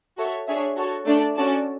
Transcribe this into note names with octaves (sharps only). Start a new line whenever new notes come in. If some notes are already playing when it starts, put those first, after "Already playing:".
F#4 A4 C#5 E5
D4 G#4 C#5 E5
F#4 A4 C#5
A3 D4 A4 D5
C#4 F#4 A4 D5 A5